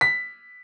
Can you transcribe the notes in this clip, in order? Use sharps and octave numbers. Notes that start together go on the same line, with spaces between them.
B6